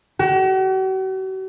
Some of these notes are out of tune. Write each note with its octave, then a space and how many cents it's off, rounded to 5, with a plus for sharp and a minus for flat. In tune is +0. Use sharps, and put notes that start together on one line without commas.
F#4 +45